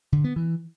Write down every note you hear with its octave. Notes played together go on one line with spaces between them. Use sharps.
D3
B3
E3